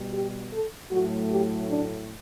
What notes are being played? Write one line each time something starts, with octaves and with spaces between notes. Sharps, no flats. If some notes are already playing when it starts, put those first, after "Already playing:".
Already playing: B2 G3
G4
A4
A2 F#3 A3 F#4
G4
D4